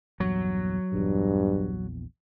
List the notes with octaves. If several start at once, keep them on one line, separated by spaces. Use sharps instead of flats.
A#1 E2 G2 F#3
A#1 E2 G2